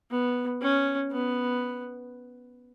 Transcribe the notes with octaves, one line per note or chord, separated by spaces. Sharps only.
B3
C#4
B3